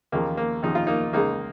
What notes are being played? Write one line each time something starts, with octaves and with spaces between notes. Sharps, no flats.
D#2 C#3 F3 A#3
A#3
D#2 C#3 F3 D#4
F4
A#3 D#4
C#2 C#3 G#3 A#3 D#4